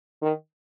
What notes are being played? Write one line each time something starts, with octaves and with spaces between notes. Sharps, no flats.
D#3